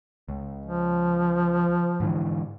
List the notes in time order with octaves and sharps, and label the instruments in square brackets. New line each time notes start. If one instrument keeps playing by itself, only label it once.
[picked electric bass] C#2
[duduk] F3
[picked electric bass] G#2 D3 E3